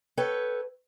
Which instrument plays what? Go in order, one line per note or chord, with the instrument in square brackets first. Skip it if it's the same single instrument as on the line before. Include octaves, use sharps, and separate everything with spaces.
[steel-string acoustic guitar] A4 B4 C#5 G5